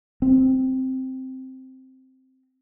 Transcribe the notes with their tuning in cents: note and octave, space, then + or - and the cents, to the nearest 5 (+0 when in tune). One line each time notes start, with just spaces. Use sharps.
C4 +0